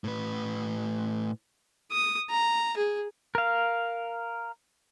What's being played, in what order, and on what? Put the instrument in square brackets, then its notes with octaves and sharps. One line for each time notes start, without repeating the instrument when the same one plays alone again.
[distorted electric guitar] A2 B4
[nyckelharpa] D#6
A#5
G#4
[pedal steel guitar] A#4 F5